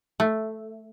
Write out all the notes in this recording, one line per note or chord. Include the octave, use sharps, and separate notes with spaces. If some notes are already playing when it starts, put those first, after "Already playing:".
A3